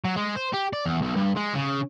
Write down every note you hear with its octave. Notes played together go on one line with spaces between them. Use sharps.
F#3
G#3
C5
G4
D5
E2
B1
G2
G#3
C#3